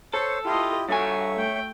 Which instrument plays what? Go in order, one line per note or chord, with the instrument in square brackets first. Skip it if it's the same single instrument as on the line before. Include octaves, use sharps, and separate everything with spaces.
[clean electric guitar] A4 [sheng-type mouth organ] C5 C#5 [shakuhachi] A5
[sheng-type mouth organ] E4 G4 [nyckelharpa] F4 D#5
[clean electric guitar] G2 G#5 [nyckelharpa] F#4 [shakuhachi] A4 [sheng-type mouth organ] C#5 E5
[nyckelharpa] A3 G5